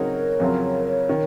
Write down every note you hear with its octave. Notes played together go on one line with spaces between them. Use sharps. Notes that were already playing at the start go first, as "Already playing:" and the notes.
Already playing: C#3 F#3 C4 D#4 F#4 A#4 C#5
F2 C#3 F#3 C4 F4
D#3